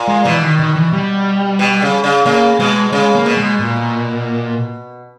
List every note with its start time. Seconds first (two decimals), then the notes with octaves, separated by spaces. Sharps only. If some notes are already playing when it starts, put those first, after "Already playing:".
Already playing: A#2
0.08 G#3
0.25 B2 E3
0.42 D#3
0.60 D#3
0.76 E3
0.93 G3
1.59 B2
1.82 C#3
2.04 C#3
2.26 C#3 A#3
2.59 B2 G#3
2.93 C#3 G#3
3.15 A#3
3.26 B2
3.37 G#3
3.60 A#2